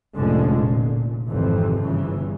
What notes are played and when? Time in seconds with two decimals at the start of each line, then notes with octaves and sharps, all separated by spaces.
0.16 F1 A2 D3 F3 G#3 C#4
0.56 A#2
1.28 G#1 F2 C3 E3 F3
1.79 G1 G2 C#3 E3